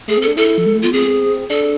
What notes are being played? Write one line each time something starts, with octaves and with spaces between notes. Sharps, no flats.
A3 G#4
C4
A4
D4
E4 A4
F3
G#3
A3
B3 F4
C4 G#4
D4 A4